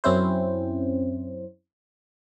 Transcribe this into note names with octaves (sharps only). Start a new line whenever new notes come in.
F#2 C4 C#4 E4 C5